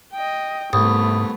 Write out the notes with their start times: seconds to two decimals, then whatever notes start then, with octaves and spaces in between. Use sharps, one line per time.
0.13 D#5 G5
0.73 C2 G#2 A3 B3 D#6